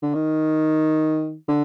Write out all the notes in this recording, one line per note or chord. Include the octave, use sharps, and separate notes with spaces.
D3
D#3
D3